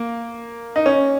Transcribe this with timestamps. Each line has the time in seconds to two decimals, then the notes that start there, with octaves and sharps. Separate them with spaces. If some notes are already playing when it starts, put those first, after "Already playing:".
Already playing: A#3
0.76 D#4
0.86 C#4